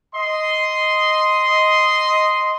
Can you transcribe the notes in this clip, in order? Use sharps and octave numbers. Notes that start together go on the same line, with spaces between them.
D#5 C6